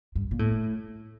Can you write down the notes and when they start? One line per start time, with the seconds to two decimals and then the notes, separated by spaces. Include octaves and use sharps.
0.15 G2
0.31 A#2
0.39 A2